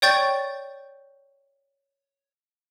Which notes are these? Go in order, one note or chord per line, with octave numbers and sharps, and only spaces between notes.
C#5 D5 G5 C#6 G6 A6